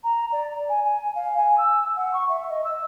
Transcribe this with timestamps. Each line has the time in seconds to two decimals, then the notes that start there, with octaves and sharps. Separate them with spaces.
0.04 A#5
0.32 D5
0.69 G#5
0.85 G#5
1.15 F5
1.38 G#5
1.58 E6
1.96 F#5
2.14 C#6
2.29 E5
2.50 D#5
2.64 E6